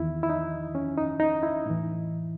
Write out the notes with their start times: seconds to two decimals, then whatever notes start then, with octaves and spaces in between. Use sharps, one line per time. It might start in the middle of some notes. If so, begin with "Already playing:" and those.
Already playing: E2 D#3 E4
0.23 E4
0.30 D#4
0.75 C#4
0.98 D#4
1.20 D#4
1.43 E4
1.66 A2 E3